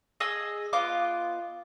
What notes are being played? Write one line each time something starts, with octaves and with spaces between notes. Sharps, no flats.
G#4 D#5 D#6 E6
B3 F4 D#5 D6